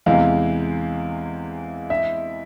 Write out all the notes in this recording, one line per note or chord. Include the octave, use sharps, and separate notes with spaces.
E2 C3 E3 G#3 F5
E5